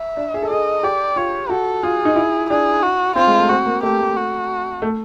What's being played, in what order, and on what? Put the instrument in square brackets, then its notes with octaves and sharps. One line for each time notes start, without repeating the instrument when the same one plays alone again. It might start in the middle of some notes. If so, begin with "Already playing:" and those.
Already playing: [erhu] E5
[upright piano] D4
G#4
A4
[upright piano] G#4 [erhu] D#5
[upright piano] G4 [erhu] D5
[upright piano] F4 [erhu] C#5
[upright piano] F#4 [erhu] A4
[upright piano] F4 [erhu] G#4
[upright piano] D#4
E4
[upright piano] D4 [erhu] G#4
[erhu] F#4
[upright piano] C4 [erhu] F4
[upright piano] G#3
A3
[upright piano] C4 [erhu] F#4
[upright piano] A#3
[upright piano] A3 [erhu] G4
[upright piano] A3
[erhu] F#4
[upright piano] A3